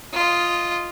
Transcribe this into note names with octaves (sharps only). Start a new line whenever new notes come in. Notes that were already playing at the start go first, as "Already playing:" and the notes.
F4 D#5